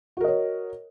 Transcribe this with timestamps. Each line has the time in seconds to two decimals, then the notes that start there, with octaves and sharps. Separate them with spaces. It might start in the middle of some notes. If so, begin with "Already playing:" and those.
0.17 F#4
0.21 A#4
0.24 D#5
0.28 C#5